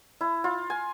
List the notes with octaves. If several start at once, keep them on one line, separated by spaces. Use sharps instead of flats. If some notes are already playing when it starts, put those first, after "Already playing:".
E4
F4
G#5